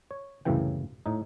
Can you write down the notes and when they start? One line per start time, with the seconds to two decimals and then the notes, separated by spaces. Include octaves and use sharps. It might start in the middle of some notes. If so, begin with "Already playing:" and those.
0.11 C#5
0.45 C2 F#2 A2 C#3 E3 G5
1.06 A2 D#4